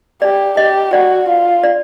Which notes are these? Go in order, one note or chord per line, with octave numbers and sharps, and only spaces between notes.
G4 D5
G4 D#5
F#4 D5
F4
D5